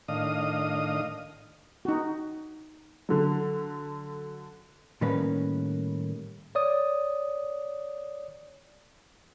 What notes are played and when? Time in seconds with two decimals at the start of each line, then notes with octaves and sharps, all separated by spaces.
0.08 A2 D#3 D4 D#5 F5 D#6
1.85 D#4 F#4
3.09 D3 F#3
5.01 A2 D#3 G3 A#3 C#4 B4
6.55 C#5 D5 D#6